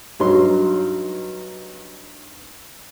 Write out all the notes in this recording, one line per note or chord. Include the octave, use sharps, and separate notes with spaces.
G2 F#3 D#4 C6